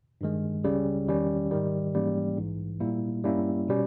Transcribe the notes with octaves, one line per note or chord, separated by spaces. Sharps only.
G2 D#3 G#3
C#2 C#3 G3 C#4
E2 D#3 G3 C#4
G#2 D#3 G3
G#2 E3 G3 A#3 C#4
A#1 G#2 E3
A#2 G3 A#3 E4
G2 G3 A#3 C#4 E4
B2 G3 C#4